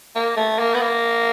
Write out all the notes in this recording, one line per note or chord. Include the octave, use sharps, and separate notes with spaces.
A#3
A3
A#3
B3
A#3